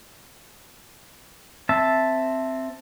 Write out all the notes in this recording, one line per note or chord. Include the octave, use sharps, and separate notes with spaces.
C4 E5 A5